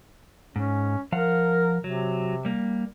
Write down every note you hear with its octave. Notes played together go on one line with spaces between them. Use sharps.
G#2 C#4
F3 A#4 F5 F#5
C3 F#3
G3 A#3